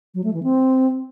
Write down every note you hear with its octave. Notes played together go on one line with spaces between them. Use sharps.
F#3
A3
E3
C4